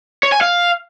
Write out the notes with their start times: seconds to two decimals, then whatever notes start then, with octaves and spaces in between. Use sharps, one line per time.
0.23 C#5
0.32 G#5
0.41 F5